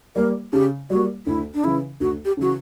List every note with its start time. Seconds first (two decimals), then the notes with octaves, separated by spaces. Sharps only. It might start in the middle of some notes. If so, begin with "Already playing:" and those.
0.16 G3 A#3 A#4
0.53 C#3 G4
0.90 G3 A#3 F#4
1.26 D2 E4
1.54 D4
1.63 C#3 E3 E4
2.00 D2 F#4
2.25 G4
2.37 C#3 E3 F#4